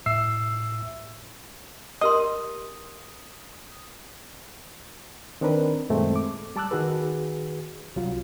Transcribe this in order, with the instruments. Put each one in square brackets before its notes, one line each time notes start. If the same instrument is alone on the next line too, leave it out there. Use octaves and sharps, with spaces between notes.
[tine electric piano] A2 E5 E6 C7
[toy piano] G4 A#4 C6 [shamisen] D#5 [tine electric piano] D#6
[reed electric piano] D#3 C4 D4 A#4 B4
F#2 A#2 D#3 G#3 A3 C4
D6
G3 A5 D6 E6 F#6
D#3 F#4 G#4 B4
C2 F#3 G3 F4